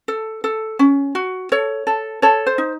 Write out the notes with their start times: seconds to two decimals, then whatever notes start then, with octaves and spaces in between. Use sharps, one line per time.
0.08 A4
0.44 A4
0.79 C#4
1.15 F#4
1.52 A4 C#5
1.87 A4
2.22 A4 C#5
2.46 C5
2.58 D#4